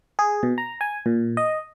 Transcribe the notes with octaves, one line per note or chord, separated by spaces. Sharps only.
G#4
B2
A#5
G#5
A#2
D#5